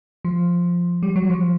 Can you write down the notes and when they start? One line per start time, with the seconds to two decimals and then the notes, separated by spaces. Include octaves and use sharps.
0.25 F3
1.03 G3
1.16 F#3
1.30 F3